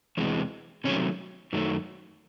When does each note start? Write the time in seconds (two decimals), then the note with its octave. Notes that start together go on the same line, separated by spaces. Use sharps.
0.17 E2 C3 E3 G#3
0.84 C3 D#3 F#3 A3 C#4
1.53 F#2 D#3 F#3 A3